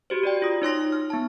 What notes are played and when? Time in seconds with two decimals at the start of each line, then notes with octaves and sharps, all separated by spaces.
0.10 F#4 G4 C5
0.23 F#4 D5 G5
0.42 F4 D#6
0.62 D#4 C#5 C6 A#6
0.92 F6
1.10 B3 D#4 A5